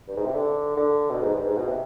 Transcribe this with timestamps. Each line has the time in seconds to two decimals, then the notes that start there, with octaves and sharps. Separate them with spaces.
0.08 G2
0.17 G#2
0.26 C3
0.34 D3
0.77 D3
1.11 B2
1.22 G#2
1.34 G2
1.45 G#2
1.57 B2
1.68 C3